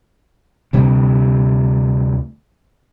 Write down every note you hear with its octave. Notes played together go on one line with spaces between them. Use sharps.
D2 C3 G3 C4